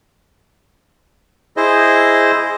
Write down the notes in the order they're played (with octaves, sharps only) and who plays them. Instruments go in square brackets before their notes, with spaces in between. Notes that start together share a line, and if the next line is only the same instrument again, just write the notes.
[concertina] E4 G#4 C5 D#5